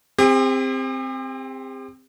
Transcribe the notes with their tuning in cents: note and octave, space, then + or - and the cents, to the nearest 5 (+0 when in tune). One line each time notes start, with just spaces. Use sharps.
C4 +0 G4 +45